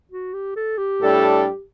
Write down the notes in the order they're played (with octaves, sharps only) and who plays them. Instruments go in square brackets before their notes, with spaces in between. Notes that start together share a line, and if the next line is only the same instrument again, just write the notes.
[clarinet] F#4
G4
A4
G4
[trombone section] A2 G3 D4 A4